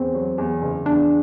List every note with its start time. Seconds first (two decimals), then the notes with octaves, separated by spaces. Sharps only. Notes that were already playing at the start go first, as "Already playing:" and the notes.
Already playing: E2 C4
0.14 F#3
0.38 E2
0.62 F#1
0.85 E2 D4